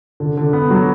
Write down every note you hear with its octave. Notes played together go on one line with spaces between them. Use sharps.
D3
D3
B3
F#3